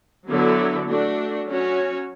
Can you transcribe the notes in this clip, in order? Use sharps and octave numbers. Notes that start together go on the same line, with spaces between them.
D3 F#3 B3 E4 A4
A3 D4 F#4
F#3 C#4 F#4 C#5